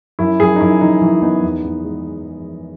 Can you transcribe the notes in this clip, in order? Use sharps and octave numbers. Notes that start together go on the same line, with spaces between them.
F#2 E4
F#2 G#4
D#4
F#2 E4
E3 D#4
E3 E4
B3 D#4
E2
E2
G#3